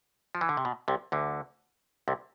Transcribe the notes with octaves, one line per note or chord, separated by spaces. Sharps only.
F3
E3
D3
C3
B2
C2 C3
D2 D3
C2 C3